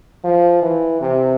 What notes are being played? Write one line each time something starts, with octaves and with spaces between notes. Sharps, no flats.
F3
E3
C3